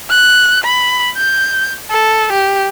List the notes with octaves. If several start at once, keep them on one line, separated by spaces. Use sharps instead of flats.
F#6
B5
G6
A4
G4